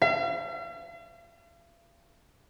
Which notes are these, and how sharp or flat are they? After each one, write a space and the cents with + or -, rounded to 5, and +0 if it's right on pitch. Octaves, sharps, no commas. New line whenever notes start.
F5 -45